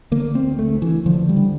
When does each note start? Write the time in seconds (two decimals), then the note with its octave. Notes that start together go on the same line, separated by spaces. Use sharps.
0.12 D3 A#3
0.35 C4
0.43 D2
0.59 A3
0.74 D2
0.82 E3
1.06 D3 F3
1.29 G3
1.37 D3